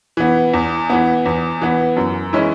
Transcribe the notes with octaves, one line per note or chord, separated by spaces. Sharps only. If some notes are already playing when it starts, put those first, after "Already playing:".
E3 B3
E2
E3 B3
E2
E3 B3
F#2
E3 G#3 C#4 E4